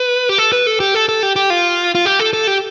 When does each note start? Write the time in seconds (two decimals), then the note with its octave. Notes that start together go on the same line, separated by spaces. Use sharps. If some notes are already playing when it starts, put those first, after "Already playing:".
Already playing: B4
0.29 G4
0.38 A4
0.53 B4
0.67 A4
0.80 G4
0.94 A4
1.09 A4
1.23 G4
1.36 G4
1.50 F4
1.95 F4
2.05 G4
2.19 A4
2.33 A4
2.47 G4